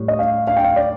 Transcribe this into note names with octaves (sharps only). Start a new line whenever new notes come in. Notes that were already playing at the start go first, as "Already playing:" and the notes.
Already playing: A2 G3
D#5
F5
F5
G5
F5
D5